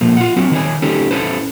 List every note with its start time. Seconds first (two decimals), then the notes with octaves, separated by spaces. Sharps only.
0.01 A#2 F3 A3 A#3
0.17 F4 F#5
0.36 F#3 C4 F#4
0.51 D#3 D4 C#5 G#5
0.82 C#4 D#4 G4 A4 C5
1.11 C#4 E4 A4 B4 C5